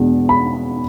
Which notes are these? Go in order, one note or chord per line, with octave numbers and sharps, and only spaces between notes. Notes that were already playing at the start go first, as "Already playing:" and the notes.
Already playing: E2 B2 G#3 D4
B5